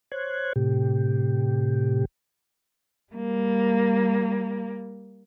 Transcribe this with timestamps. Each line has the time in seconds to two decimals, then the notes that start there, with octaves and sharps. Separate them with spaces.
0.12 C5 C#5 F#6 G#6
0.56 A2 C3 G4
3.13 G3 A#3